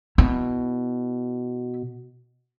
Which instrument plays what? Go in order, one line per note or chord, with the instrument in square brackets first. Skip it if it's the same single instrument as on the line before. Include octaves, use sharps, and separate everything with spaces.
[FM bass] B2 [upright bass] E4